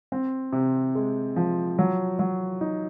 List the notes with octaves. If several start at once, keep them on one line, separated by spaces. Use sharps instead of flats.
C4
C3
G#3
F3
F#3
F#3
D#4